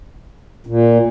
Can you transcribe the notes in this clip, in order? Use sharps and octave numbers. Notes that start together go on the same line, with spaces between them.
A#2